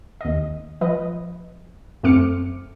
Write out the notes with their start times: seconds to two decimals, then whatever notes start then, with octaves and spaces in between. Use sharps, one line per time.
0.21 D#2 D#5
0.81 F3 B4 D#5
2.03 F#2 A3 C4 D6 F6 C#7